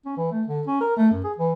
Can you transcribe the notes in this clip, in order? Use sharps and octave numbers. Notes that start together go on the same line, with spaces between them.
C#4
E3
A3
D3
C#4
A#4
A3
F#2
G#4
E3